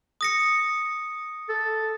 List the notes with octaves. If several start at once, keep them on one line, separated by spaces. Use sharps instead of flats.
D#6 A#6 C#7
A4